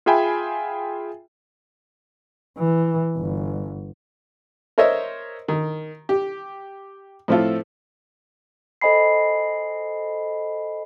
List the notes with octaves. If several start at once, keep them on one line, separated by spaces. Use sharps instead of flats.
F4 G#4 E5 G5 G#5 B5
E3
G1
A#4 C5 C#5 D#5 E5
D#3
G4
A2 F3 C4 E4 F4 A4
A4 C5 D#5 G#5 B5 C7